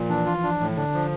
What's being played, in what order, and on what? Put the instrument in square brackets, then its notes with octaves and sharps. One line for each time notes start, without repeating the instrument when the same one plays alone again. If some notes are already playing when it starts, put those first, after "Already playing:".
Already playing: [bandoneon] A#2 [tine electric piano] F3
[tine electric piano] E3 [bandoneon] D4
[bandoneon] F4
D4
A2
[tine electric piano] D3 [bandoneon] D4
[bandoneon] F3